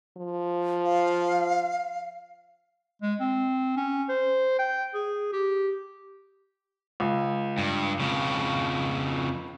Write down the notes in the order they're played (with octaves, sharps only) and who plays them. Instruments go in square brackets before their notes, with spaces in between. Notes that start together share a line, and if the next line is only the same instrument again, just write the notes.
[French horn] F3
[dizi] F5
[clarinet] G#3
C4
C#4
C5
G5
G#4
G4
[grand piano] C#2
[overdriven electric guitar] G2
F2 C#3